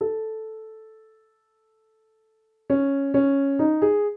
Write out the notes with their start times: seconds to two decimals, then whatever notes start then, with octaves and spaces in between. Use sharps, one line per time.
0.01 A4
2.70 C#4
3.14 C#4
3.59 D#4
3.82 G#4